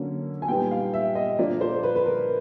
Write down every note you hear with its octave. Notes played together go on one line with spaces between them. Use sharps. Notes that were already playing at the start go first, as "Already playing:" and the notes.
Already playing: D3 F#3 A#3 C#4
G#5
A#2 G3 B3 D#4 G5
F5
E5
D#5
A#2 F3 A#3 D4 D5
C5
B4
B4
A#4